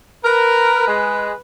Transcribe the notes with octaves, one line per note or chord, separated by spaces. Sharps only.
A#4 B4
G#3